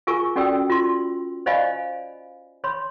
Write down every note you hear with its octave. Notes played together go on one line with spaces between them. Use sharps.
F4 G#4 A#4 G#5 C#6
C#4 F#4 A4 D5 G5 E6
F4 C6
C5 D5 D#5 F5 G#5 B5
C#5 B5 C6